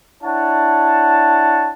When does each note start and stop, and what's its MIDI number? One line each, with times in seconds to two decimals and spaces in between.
0.23 1.73 62
0.23 1.73 64
0.23 1.73 73
0.23 1.73 78
0.23 1.73 81